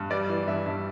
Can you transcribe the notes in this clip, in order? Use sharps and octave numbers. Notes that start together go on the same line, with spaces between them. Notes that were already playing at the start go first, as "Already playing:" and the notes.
Already playing: G2
G3 D5
E3
G2 E5
G2